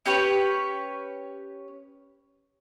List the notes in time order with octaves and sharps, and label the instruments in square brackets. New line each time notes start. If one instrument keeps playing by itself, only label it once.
[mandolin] C#4 G4 B4 C#5